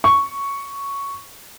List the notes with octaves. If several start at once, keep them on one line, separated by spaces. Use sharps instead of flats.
C#6